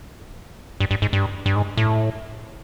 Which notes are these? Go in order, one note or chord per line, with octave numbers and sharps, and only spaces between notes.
G2
G2
G#2
G2
G2
G#2
A2